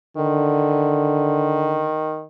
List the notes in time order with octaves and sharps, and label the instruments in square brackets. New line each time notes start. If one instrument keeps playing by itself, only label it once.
[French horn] D3 [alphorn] D#3